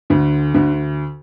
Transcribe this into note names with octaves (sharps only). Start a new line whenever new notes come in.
D2 D3
D2 D3